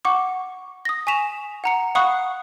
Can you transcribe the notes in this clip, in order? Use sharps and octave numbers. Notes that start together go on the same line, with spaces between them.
F#5 C#6 D6
D#6 A#6
G#5 C#6 B6 E7 F7
F#5 A#5 C#7
F5 F#5 B5 C#6 D#6 F#6